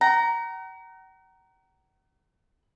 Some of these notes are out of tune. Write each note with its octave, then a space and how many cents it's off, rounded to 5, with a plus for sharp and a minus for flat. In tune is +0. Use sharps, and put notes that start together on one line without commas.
F#5 +45 A#5 +0